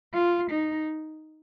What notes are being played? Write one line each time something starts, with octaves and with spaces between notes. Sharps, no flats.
F4
D#4